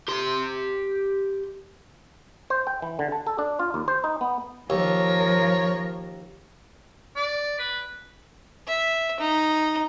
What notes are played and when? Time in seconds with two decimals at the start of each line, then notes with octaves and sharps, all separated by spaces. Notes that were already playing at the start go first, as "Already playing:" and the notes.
0.08 G4 C6
2.50 C5
2.67 G5
2.82 E3
2.99 D3
3.12 A5
3.27 A4
3.38 D4
3.59 F4
3.74 D#2
3.88 C5
4.04 D#4
4.21 B3
4.70 D#2 F3 A#4 C#5
7.16 D5
7.59 B4
8.68 E5
9.20 D#4